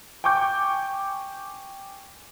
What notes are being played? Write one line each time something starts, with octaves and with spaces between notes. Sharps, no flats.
G5 G#5 C#6 D6 G6